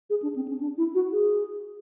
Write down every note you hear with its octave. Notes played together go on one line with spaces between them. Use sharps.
G#4
D4
C4
C#4
D4
E4
F#4
G#4